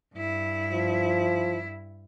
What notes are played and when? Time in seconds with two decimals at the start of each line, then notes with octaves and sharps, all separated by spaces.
0.15 G2 E4
0.71 F3